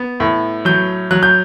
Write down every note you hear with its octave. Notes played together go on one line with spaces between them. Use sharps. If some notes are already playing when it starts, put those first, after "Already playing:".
Already playing: B3
A2
F#3 G6
F#3 F#6
G6